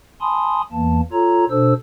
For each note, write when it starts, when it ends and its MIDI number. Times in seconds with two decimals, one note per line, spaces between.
0.21 0.62 80
0.21 0.62 81
0.21 0.62 83
0.21 0.62 84
0.21 0.62 87
0.72 1.01 40
0.72 1.01 52
0.72 1.01 58
0.72 1.01 81
1.12 1.45 65
1.12 1.45 69
1.12 1.45 73
1.12 1.45 82
1.50 1.73 47
1.50 1.73 62
1.50 1.73 69
1.50 1.73 72
1.50 1.73 88